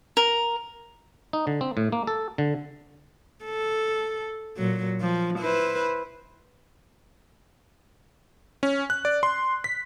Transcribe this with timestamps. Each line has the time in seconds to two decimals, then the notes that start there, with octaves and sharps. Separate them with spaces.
0.17 A#4
1.33 D#4
1.47 D3
1.61 C4
1.77 A2
1.92 A#3
2.07 A4
2.38 D3
3.45 A4
4.57 A#2 F#3
5.01 F3
5.39 E4 B4 C5
8.63 C#4
8.90 F#6
9.05 D5
9.23 C6
9.64 B6